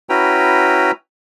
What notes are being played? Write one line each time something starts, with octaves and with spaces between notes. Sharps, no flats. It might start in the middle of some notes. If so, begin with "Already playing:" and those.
C#4 E4 F#4 B4 G5 A#5